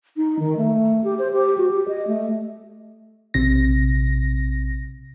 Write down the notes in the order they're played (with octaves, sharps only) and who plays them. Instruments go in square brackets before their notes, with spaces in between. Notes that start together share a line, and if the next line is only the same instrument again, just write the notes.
[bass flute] D#4
D#3
A3
G4
C5
G4
F#4
G4
D#5
A3
[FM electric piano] A#1 C3 A#6